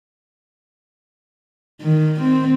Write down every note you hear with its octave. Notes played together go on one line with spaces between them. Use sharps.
D#3
C4